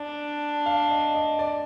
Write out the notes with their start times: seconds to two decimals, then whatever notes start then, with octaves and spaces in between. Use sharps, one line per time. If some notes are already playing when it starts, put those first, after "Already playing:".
Already playing: D4 A5
0.66 F5
0.91 D#5
1.15 D#5
1.39 D5